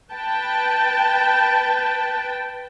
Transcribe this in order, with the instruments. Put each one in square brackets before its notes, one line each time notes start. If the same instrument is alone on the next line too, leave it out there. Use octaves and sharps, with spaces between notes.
[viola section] B4 G5 A5